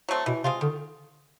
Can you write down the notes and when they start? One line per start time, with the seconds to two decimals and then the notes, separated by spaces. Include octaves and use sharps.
0.09 F#3 A3 C4
0.26 B2 E3
0.44 C3 G#3 C4 F4
0.61 D3 D#3